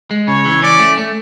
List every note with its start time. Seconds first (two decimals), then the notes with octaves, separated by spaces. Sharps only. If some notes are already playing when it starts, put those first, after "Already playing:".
0.11 G#3
0.28 C#3 C#5
0.45 E3
0.62 C#4 D5
0.79 A3
0.97 A3